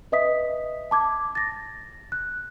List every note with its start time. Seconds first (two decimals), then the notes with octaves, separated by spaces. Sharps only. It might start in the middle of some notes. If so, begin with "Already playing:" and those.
0.12 B4 D#5 E5 D#6 B6
0.91 A5 D6 G#6
1.35 A6 A#6
2.12 F#6